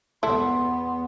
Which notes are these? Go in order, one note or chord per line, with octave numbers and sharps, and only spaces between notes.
E2 B3 E4 A4 C6